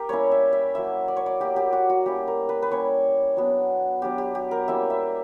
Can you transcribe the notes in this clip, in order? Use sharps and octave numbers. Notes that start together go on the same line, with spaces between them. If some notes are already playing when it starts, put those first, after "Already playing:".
Already playing: G4 A#4
G3 A#3 C#4 E4 C#5
E5
E5
F#3 A#3 E4 E5
D5
C#5
D5
F#3 A#3 E4 G4
G4
F#4
F#4
G3 A#3 C#4 E4 G4
A#4
B4
B4
G3 A#3 C#4 E4 C#5
F#3 B3 D4
F#3 B3 D4 G4
G4
G4
A#4
G3 A#3 C#4 E4 E5
E5